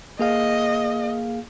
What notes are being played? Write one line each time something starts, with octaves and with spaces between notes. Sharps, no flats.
A#3 G#4 D#5 F5